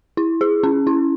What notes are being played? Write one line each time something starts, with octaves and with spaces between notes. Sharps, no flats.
E4
G#4
C#4
E4